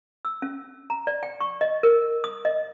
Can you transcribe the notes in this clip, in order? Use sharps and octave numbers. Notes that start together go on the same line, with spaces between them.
E6
C#4
A#5
D5
G5
C#6
D#5
A#4
D#6
D#5